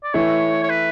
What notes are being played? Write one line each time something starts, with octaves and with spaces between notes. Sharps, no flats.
D5
E3 A3 E4 C#5
C#5
B4